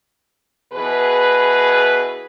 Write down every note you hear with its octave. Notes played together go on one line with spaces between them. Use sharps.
B2 E3 G#4 B4